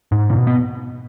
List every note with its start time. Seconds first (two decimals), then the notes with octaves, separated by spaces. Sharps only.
0.12 G#2
0.30 B2
0.47 B3